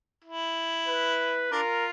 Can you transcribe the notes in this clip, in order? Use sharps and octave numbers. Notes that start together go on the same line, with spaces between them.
E4
B4
D4 F4 A#4